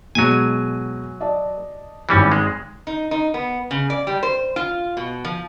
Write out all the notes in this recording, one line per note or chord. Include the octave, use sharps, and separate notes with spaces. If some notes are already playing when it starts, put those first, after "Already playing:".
B2 F#3 G#3 G#5 D#7
D5 D#5 A5
G#1 E3 G3 C#4 D6
G#3
D#4
D#4
B3
C#3
D5
G3
C5
F4
B2
F3